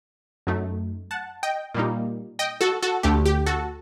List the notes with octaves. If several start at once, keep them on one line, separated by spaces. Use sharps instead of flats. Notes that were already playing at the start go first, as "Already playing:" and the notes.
F#2 F#3 A3 D#4
F#5 A5
D#5 G5
A#2 G3 A#3 D#4
D#5 G5
F#4 A4
F#4 A4
D2 D3 A3 G4
G4
F#4 A4